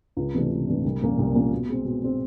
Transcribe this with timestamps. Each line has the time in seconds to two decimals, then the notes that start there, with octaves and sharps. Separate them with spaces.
0.17 C#2
0.35 C3 E3 A3 D4
0.51 C#2
0.67 C3 E3 A3 D4
0.85 C2
1.01 A#2 F3 A#3 C#4
1.18 C2
1.34 A#2 F3 A#3 C#4
1.52 B2
1.68 G#3 C4
1.85 B2
2.02 G#3 C4